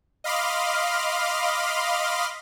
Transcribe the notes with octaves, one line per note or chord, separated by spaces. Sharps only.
D#5 F5 B5 C6 D6 F6